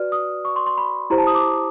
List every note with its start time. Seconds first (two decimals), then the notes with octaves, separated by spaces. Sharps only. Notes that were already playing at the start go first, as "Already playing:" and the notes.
Already playing: F#4 B4 D5 F6
0.12 D#6
0.45 C#6
0.56 C6
0.66 C6
0.78 B5
1.10 E4 G4 C5 A#5
1.18 A5
1.27 D#6
1.35 D6